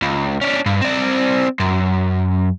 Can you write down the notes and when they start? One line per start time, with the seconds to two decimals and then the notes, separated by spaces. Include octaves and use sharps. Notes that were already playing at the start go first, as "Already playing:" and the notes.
0.02 C#2
0.41 C#4 D4
0.66 G2
0.81 C4 D5
1.60 F#2